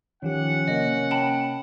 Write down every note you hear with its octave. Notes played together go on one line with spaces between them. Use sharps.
D#3 F3 C#4 G4 F#5
C3 A#3 D#5
G5 A5 B5